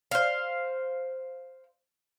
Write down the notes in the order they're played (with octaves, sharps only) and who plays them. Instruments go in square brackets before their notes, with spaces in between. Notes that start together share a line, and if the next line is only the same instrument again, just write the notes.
[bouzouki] C5 F5